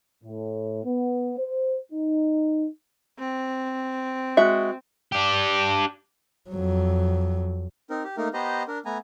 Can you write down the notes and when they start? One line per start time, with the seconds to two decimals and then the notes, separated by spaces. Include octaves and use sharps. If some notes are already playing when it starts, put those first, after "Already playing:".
0.24 A2
0.85 B3
1.38 C5
1.92 D#4
3.19 C4
4.37 G#3 F#4 E5
5.12 D4 G4
6.50 F2 F#3
7.90 C4 D#4 A#4
8.04 G4
8.17 A3 A#3 D#4 A#4
8.34 B3 G4 C5 D#5 A#5
8.68 D4 A#4
8.85 A3 B3 G#5 A#5